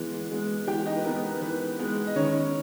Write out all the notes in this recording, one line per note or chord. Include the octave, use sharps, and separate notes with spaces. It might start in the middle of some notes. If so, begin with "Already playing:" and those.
Already playing: E3 G#3 B3
G#3 B3
E3 G4 G5
D#4 D#5
B4
G#3 B3 A#4
B4
E3 B4
G#3 B3
D#5
D#3 C#4 C#5